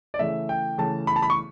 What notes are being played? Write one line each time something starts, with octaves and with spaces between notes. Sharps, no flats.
D5
C#3 E3 A3 E5
G5
C#3 E3 A3 A5
B5
A5
B5
C#6